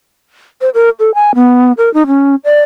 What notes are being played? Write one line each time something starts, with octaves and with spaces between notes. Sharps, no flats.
C5
A#4
A4
G#5
B3
A#4
D#4
C#4
D5